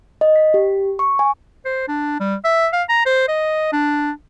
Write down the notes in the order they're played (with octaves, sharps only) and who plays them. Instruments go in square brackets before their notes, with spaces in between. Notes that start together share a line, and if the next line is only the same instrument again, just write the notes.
[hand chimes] D#5
B6
G4
C#6
G#5
[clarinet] C5
D4
G3
E5
F5
A#5
C5
D#5
D4